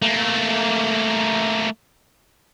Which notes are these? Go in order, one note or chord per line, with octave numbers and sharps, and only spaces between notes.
A3 A#3